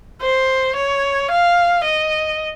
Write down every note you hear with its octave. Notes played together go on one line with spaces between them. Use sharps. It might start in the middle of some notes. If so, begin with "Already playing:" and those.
C5
C#5
F5
D#5